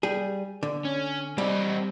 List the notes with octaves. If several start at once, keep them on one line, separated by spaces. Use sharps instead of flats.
G3 G#4
D3
C#4
G3 C4 D#4